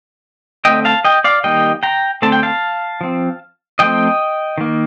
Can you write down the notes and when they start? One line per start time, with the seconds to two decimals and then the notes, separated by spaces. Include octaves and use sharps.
0.65 D3 A3 C4 D#5 G5
0.85 F5 A5
1.05 D#5 G5
1.24 D5 F5
1.44 D#3 G3 A#3 D#5 G5
1.83 G5 A#5
2.22 D3 A3 C4 A5
2.32 G5
2.43 F5 A5
3.01 F3 C4
3.79 F3 A3 C4 D#5 G5
4.58 D#3 A#3